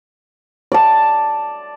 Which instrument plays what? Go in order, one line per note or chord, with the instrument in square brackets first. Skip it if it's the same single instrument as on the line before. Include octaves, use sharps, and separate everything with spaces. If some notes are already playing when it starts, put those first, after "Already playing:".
[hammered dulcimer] D5 A5